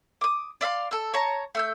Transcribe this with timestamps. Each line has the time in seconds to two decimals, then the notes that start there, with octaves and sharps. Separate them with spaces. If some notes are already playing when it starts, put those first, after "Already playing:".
0.21 D6 D#6
0.61 D5 E5 F5 C6
0.91 A4 E6
1.14 C#5 A5 A#5
1.55 A3 E6 G6